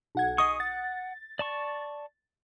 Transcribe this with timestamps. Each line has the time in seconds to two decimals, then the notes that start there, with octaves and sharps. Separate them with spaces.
0.15 B1 F#5 G#6
0.38 G#4 D#5 C#6 D#6
0.60 F#5 A6
1.39 D5 A5 C#6